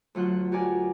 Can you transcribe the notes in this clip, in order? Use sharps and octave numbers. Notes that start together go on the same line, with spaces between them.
D2 F#3 F4 F#6
F#4 G4 A#4 D5 G#5